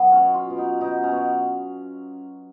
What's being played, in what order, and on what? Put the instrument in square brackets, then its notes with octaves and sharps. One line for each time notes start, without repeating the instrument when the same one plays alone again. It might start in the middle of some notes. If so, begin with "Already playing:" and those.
Already playing: [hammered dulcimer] F#3 B3
C#4
B2
F4
B2
D#4
B2 D#4
C#4
B2